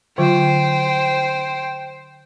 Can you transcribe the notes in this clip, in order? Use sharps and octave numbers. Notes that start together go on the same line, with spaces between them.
D3 F#3 F4 C5 G5